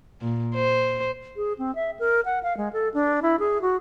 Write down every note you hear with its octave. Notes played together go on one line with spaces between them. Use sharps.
A#2
C5
G#4
C4
E5
A#4
F#5
F5
G#3
A4
D4
E4
G#4
F#4